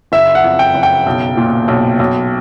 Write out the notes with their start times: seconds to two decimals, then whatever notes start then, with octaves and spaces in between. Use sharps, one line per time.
0.12 F#1 E5
0.35 F#5
0.44 F2
0.59 G5
0.75 F#1
0.83 G5
1.06 B1
1.37 A#2
1.68 B1
1.99 B1